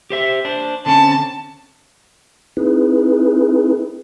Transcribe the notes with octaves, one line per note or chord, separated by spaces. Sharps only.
G4 C5 E5
D4 C5
D3 C4 C#4 A5
C4 D#4 E4 G#4 B4